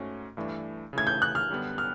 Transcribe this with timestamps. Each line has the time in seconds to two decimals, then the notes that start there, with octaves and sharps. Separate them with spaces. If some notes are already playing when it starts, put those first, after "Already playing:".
Already playing: G#2 A3 C#4 F#4
0.37 G2 E3 A3 D4
0.93 C#3 E3 A3 G#6
1.07 G6
1.22 F#6
1.35 F6
1.50 F#2 D3 G3 B3
1.78 F6